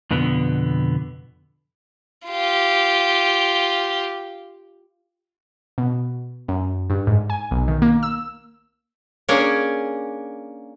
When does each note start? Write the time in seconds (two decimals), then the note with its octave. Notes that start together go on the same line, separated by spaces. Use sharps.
0.11 F2 B2 D3 B3
2.27 F4 G4
5.78 B2
6.48 F#2
6.90 G2
7.07 G#2
7.30 G#5
7.51 B1
7.68 D#3
7.82 A#3
8.03 E6
9.29 A#3 C#4 D4 G#4